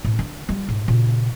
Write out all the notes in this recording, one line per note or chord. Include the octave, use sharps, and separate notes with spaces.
A2
D3
G3 F4
G#2
A#2 C#3